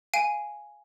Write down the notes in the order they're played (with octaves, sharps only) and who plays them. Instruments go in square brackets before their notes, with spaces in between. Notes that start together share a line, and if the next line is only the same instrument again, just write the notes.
[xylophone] F5 G#5 D7 D#7